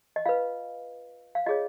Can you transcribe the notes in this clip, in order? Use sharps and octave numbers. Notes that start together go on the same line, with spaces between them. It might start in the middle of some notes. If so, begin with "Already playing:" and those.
D#5
F4 B4 F5
F5
F4 G#4 C#5 D#5